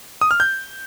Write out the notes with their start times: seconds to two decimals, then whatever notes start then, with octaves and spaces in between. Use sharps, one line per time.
0.21 D#6
0.31 F6
0.40 G6